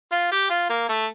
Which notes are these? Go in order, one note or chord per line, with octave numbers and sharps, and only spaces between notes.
F4
G4
F4
A#3
A3